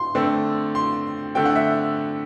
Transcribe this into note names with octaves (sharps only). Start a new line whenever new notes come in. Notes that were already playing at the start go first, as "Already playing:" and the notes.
Already playing: C6
D3 A3 C4
C6
D3 A3 C4 G5
F#5
E5